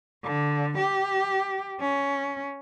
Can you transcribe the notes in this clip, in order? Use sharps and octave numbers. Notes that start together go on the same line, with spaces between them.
D3
G4
C#4